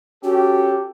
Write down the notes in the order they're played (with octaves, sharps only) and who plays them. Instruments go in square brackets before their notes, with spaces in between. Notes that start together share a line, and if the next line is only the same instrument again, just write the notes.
[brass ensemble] C#4 G4 A4 [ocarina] F#4